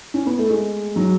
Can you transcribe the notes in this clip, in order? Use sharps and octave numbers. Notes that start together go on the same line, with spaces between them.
C#4
B3
A3
G#3
F#3